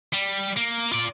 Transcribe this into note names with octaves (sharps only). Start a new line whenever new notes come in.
G3
A#3
F4 D5